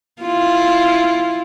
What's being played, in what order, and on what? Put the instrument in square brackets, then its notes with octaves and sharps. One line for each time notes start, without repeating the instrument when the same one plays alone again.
[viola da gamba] E4 F4